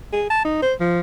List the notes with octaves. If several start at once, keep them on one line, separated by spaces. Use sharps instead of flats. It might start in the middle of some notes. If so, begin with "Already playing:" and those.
G#4
A5
D#4
C5
F3